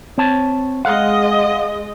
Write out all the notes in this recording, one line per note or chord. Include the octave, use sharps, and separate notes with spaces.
C4 C#5 A5
G#3 D#5 F5 F#5